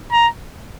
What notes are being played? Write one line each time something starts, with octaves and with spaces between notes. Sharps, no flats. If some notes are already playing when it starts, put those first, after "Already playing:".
A#5